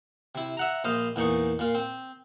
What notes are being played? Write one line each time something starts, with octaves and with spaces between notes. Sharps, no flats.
C3 E4
E5 F#5 A#5
A#1 C5 D#5 F5
E2 A#2 D#4 C#6
A#2 F4
C4